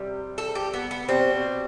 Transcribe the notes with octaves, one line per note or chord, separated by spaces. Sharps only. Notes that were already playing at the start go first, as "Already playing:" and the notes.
Already playing: C3 G3
A4
G4
B3
B3
B2 G3 C4